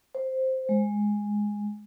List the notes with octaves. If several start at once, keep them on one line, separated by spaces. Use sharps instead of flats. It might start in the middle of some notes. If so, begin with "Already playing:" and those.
C5
G#3